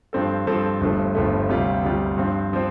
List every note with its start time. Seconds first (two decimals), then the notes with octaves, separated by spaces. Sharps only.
0.13 G2 F3 C4 A4
0.47 G2 F3 C4 A4
0.81 G1 G2 F3 A3
1.15 G1 G2 F3 A3
1.49 D2 C3 G3 F4
1.83 D2 C3 G3 F4
2.17 G2 F3 C4
2.53 F3 C4